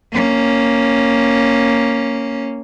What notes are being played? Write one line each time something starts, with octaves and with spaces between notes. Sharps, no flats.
A#3 C#4